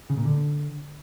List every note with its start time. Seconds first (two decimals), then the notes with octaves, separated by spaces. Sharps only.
0.10 C#3
0.17 A#2
0.25 D3